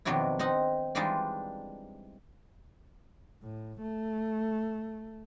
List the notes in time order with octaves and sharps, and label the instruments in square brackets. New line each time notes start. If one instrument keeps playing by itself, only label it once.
[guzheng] F2 B2 D#3 F#3 D4 E4
C4 D#4 D#5 F#5
E3 G3 G#3 D4 D#4 F4
[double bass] A2
A3